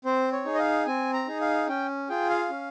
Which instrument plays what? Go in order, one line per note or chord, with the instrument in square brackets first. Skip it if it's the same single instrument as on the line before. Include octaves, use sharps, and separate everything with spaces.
[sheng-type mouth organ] C4 C5
C#5
D#4 G#4
D#5
F5
C4 G#5
A#5
D#4 G#4
F5
C#4 G5
F4 G#4 G5
F5
C#4